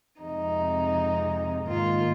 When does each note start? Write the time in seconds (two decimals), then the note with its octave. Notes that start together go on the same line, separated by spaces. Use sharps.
0.21 F2 C3 G#3 D#4
1.67 G#2 D#3 A#3 F4